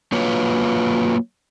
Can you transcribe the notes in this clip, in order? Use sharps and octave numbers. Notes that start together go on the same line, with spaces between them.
F#3 A#3 F4 B4 C#5